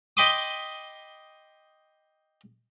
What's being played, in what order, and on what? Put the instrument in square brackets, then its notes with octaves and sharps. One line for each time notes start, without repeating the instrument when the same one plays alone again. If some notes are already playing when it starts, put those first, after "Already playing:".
[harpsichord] D#5 G5 B5 C6 D6 D#6